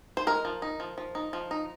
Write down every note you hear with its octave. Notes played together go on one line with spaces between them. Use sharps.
C5
G#3 A#4
F3
D#4
F3
F3
D#4
F3
D#4